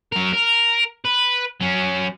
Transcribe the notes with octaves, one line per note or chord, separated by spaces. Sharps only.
F#3 A#4
A#4
B4
F#3 C#4